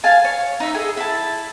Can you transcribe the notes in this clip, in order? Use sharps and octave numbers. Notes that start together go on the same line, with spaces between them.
F5 G#5 A5
C#5
D#4 E5
G#4 A4
E4 A5